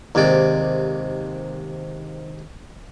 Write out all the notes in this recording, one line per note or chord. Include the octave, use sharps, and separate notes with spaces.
D#2 G#2 C3 D5